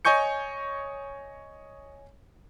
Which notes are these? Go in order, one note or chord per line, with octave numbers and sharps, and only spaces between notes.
C#5 D#5 G#5 C#6 G6 C#7